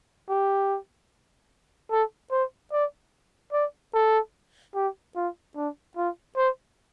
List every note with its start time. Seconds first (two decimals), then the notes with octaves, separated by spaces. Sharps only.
0.30 G4
1.91 A4
2.31 C5
2.72 D5
3.53 D5
3.94 A4
4.75 G4
5.16 F4
5.56 D4
5.97 F4
6.37 C5